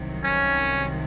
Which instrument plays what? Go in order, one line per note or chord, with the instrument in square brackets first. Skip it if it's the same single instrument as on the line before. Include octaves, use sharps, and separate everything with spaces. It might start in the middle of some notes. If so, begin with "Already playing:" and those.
Already playing: [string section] C2 C3 D#3 F#3
[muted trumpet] C#4